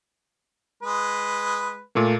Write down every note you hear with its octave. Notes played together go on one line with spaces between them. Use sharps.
G#3 B4
A#2 A3 A#3